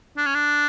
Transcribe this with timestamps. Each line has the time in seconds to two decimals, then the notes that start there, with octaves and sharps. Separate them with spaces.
0.17 D4
0.26 C#4
0.35 D4